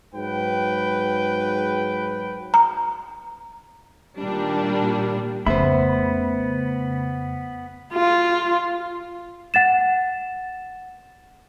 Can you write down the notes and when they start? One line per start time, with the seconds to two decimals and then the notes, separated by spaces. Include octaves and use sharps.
0.14 G#2 F#3 B4 G5
2.54 A#5
4.18 A#2 D#3 G3 D4
5.47 F2 C#3 A3 B3 C5 E5 B5
7.94 F4
9.54 F#5 A6 E7